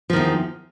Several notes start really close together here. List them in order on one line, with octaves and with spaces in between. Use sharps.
F3 D#3 E2